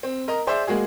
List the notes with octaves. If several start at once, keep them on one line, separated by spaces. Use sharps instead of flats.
C4
A#4 D#5 A#5
G#4 C5 D5 E5
G#3 A#3 F#4 G#4